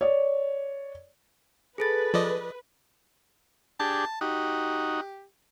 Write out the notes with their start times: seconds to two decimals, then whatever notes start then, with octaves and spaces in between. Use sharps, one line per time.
0.01 C#5 D5
1.78 G#4 A4 B4 A6
2.14 F3 D5 D#5
3.80 D4 G4 G#4 A5
4.21 D#4 F#4 G4